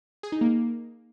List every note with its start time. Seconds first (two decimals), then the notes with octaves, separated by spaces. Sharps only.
0.23 G#4
0.32 D#4
0.41 A#3